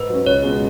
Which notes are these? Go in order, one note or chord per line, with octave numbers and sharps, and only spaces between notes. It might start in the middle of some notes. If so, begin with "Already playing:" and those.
Already playing: G#2 B4
F#3 C#4
C#2 C#5
B2 G#3